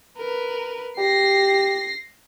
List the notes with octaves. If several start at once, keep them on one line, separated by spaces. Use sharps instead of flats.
A#4 B4
G4 A#6 C7